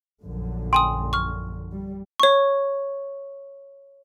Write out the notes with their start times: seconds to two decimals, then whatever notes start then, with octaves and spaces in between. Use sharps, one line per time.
0.22 A#1 F#2 D3
0.73 G5 G#5 C6 D#6
1.13 C#6 F6
1.71 G3
2.20 C#5 C#6